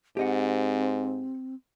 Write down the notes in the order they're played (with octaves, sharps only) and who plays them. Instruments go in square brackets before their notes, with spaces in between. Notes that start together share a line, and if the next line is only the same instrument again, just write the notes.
[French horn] G#2 [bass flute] C4 [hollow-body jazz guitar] G4 D#5 F#5